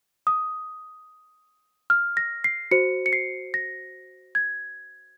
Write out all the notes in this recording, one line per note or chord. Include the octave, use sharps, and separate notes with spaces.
D#6
F6
A#6
C7
F#4 C5 C#7
C#7
C7
A#6
G#6